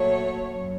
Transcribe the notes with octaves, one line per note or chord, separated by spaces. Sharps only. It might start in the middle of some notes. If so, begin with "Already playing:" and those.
Already playing: A#2 F#3 A3 C#5
F#2